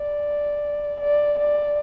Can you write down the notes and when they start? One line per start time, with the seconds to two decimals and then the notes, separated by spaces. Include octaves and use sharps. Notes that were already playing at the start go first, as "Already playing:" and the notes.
Already playing: D5
1.00 D5
1.38 D5